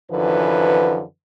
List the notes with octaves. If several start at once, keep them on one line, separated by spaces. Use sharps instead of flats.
F#2 D3 E3 F3 B4